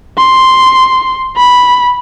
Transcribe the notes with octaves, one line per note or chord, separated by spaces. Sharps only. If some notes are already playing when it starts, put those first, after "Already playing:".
C6
B5